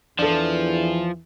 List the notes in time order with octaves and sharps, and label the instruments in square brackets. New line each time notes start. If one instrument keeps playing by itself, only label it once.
[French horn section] E2 E3 [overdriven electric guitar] F3 [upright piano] D4 A4